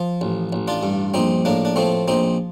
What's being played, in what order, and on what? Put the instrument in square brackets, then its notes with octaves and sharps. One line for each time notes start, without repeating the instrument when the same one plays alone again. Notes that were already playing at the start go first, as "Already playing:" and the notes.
Already playing: [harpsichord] F3
A1
A1
D4 F4
G2
A#1 C4 D#4
A2 A#3 D4
D4
F3 A3 C4
A#1 C4 D#4